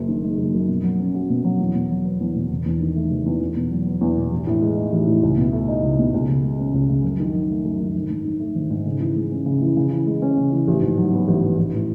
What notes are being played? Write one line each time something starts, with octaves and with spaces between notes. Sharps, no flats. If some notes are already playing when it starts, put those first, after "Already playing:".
Already playing: F#1 F#2
D#3
G#3
F#1
F#2
B2
F#3
C#4
F#4
B2
F#3
E2
B2
F#3
B3
E2
B2
E1
E2
D#3
A3
E1
E2
E2
B2
F#3
B3
E2
B2
A1
A2
G#3
D#4
A1
A2
C#2
B2
A3
D#4
C#2
B2
C#2
C#3
G#3
C#4
C#2
C#3
F#2
D#3
F#3
A3
F#2
D#3
G#1
G#2
D#3
A3
G#1
G#2
C#3
E3
G#3
C#4
C#3
E3
C#3
E3
G#3
C#4
C#3
E3
A1
G#2
F#3
B3
A1
G#2
A1
A2